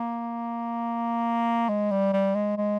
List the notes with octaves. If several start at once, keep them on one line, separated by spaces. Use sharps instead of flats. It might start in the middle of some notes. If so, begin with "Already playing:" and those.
Already playing: A#3
G#3
G3
G3
G#3
G#3